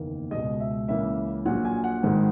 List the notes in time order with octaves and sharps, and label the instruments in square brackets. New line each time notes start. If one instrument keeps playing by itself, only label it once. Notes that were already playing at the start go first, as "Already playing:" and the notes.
Already playing: [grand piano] F#1 E2 D#3 A#3
C#2 B2 G#3 D#5
E5
C#2 C#3 E3 A#3 E5
A#1 A#2 F#3 F#5
G#5
F#5
G#1 G#2 D#3 G#3